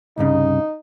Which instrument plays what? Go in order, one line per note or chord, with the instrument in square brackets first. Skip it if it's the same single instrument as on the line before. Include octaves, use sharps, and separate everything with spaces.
[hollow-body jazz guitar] C2 G2 C#3 [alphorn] D#4